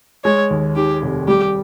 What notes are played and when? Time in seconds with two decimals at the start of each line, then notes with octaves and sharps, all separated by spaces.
0.24 G#3 C#5
0.51 D#2
0.76 D#3 G4
1.02 F1
1.28 G3 G4